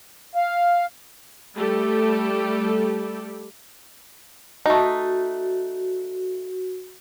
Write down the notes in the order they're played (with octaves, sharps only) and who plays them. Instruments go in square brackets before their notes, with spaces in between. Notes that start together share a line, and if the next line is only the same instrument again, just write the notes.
[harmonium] F5
[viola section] G3 A3 G4 A4
[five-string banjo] A3 D#4 [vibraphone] F#4